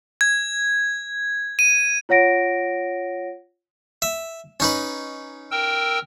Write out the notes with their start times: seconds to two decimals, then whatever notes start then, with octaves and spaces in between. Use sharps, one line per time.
0.21 G#6
1.59 D#7
2.09 F4 C#5 F#5 A#6 D7
4.02 E5
4.60 C#4 D#4 B4
5.51 A#4 G5 E6